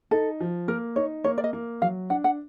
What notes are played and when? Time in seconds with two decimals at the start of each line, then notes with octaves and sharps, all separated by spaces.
0.11 D#4 A4
0.40 F3
0.68 A#3 A#4
0.96 D#4 C#5
1.24 A#3 C#5
1.38 D5
1.44 D#5
1.53 A#3
1.82 F#3 F5
2.10 D4 F#5
2.24 F#5